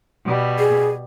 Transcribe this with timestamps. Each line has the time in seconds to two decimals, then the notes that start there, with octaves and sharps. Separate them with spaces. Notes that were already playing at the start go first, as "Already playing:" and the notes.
0.25 B2 G3
0.59 G#4